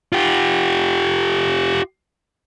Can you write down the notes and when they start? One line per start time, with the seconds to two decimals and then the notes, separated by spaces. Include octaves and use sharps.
0.13 F4 G4